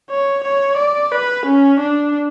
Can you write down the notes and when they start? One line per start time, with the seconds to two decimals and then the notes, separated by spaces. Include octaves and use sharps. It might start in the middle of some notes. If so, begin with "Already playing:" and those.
0.10 C#5
0.44 C#5
0.77 D5
1.12 B4
1.46 C#4
1.80 D4